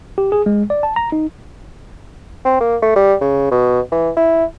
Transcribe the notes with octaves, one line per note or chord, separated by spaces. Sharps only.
G4
G#4
G#3
D5
A5
A#5
D#4
C4
A#3
A3
G3
C#3
B2
E3
E4